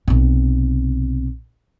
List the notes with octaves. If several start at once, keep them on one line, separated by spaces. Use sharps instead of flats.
B1 C3